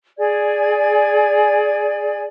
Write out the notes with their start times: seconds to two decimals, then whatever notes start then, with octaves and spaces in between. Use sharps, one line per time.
0.19 G#4 D5 G#5 G#6